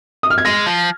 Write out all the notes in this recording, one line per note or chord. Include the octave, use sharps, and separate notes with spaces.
D#6
F6
G#6
G#3 A#6
F3